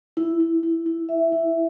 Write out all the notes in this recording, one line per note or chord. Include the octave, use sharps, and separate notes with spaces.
E4
E4
E4
E4
E5
E4